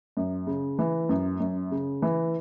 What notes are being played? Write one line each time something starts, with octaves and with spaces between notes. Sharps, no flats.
F#2
C#3
E3
F#2
F#2
C#3
E3